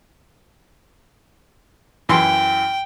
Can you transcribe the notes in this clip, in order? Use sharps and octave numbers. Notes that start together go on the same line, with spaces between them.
F#2 E3 G5 C6